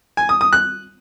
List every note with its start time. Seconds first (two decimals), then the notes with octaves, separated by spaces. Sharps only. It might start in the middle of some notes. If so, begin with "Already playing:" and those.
0.17 G#5
0.29 D#6
0.41 D#6
0.53 F#6